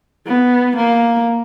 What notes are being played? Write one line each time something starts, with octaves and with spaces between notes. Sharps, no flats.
B3
A#3